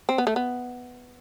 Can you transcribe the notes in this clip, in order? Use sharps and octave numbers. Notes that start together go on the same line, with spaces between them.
C4
B3
A3
B3